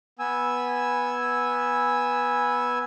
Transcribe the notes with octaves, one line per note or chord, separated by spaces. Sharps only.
B3 G#5 E6